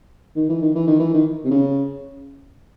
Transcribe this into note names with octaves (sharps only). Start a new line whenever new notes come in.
D#3
E3
D#3
E3
D#3
E3
D#3
C3
C#3